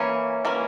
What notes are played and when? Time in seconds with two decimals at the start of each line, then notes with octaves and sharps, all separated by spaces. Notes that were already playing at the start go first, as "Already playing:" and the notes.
Already playing: E3 A#3 C#4
0.45 E3 A#3 C#4